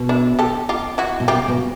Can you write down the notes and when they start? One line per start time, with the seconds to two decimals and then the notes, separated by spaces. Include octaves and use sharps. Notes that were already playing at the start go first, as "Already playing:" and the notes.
Already playing: B2
0.09 D4 E4
0.39 G4 A4
0.69 F4 G4
0.98 E4 F#4
1.20 B2
1.28 C3 F4 G4
1.48 B2